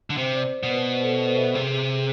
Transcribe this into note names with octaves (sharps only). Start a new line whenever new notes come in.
D3
C3 C5
D5
B2
B4
C5
A4
C5
B4
E5
C3 G#4
G#4
G#4